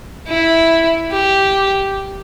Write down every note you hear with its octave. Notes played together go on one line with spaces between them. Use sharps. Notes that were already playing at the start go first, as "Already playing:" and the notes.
E4
G4